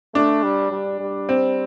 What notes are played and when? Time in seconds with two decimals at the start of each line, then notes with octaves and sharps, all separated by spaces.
0.14 A3 D4
0.43 G3
0.71 G3
1.00 G3
1.29 C4